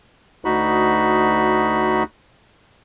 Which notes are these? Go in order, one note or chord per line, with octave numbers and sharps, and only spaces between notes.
D2 D#4 F#4 B5